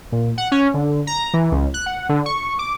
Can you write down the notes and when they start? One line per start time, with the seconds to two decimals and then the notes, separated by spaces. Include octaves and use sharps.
0.12 A#2
0.38 F#5
0.52 C#4
0.74 D3
1.07 A#5
1.34 E3
1.52 C#2
1.74 F#6
1.86 F#5
2.09 D3
2.26 C#6
2.59 D6